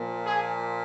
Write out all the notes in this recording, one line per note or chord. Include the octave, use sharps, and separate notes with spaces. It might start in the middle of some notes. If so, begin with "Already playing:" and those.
Already playing: A#2 F3
G#4